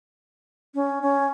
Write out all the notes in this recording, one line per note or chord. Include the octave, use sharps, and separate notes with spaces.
C#4
C#4